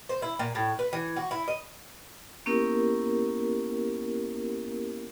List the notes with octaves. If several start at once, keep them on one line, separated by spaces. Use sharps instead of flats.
C5
E4
A#2
A2
B4
E3
F#4
E4
D#5
A#3 B3 C#4 E4 G4 A#4